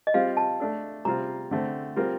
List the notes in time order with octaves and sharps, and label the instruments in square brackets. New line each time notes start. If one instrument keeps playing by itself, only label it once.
[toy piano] D#5
[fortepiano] G3 C4 F4 [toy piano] F5
[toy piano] A5
[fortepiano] A3 D4 A4
[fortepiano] C3 G3 C4 F4 [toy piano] A#5
[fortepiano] D3 A3 C4
G3 C4 F4 A#4